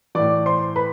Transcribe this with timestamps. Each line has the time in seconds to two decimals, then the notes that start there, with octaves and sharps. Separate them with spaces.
0.15 A2 E3 D5 D6
0.46 C5 C6
0.76 B4 B5